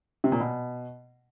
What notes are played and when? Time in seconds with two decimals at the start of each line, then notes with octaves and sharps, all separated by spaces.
0.24 C3
0.32 A#2
0.40 B2